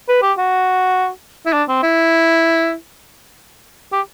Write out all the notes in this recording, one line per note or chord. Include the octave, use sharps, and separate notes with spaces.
B4
G4
F#4
E4
D4
C4
E4
G4